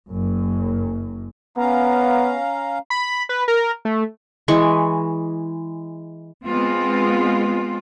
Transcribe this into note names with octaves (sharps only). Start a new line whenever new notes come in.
F#1 F#2
B3 C#4 F5 A#5
B5
B4
A#4
A3
E3 G#3 C#6
G#3 B3 C4 F4